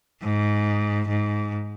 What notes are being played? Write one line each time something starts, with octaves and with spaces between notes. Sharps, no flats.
G#2
G#2